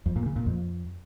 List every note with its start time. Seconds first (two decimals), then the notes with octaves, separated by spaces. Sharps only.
0.06 F2
0.16 A#2
0.26 C#3
0.36 A#2
0.46 F2